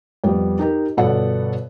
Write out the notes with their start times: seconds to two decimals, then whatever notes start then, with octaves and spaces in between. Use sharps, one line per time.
0.24 F2 G3 B3
0.59 D#4 G4 A#4
0.97 G1 B2 B3 A4 D5 F#5